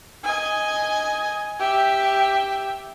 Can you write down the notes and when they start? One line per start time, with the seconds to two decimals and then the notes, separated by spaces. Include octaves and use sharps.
0.23 D#5 G#5
1.60 G4 E5